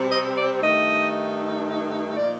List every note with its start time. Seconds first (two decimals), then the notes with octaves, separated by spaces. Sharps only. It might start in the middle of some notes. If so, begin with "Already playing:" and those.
Already playing: C3 G3 C4
0.11 D#5
0.36 D5
0.62 G2 D#3 A3 D#4 D#5
2.17 A#2 F3 A#3 D#4 D5